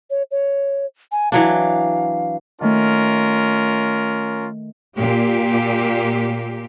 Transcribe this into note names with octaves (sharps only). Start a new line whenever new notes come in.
C#5
C#5
G#5
E3 F#3 D4 F5
D#3 A3 C#4 F4 A#4
A#2 G4